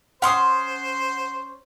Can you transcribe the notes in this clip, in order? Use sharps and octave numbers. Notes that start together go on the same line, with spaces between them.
C#4 C5 F#5 C6 D#6